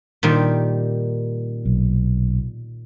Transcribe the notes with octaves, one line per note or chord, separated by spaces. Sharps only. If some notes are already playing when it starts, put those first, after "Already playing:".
A#2 D#3 G3
B1